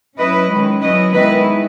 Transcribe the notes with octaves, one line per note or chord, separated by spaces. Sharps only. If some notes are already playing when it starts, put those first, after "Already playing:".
F#3 C#4 E4 B4 D#5
D#3 G#3 C#4
F#3 C#4 E4 B4 D#5
D#3 G#3 B3 E4 B4 D#5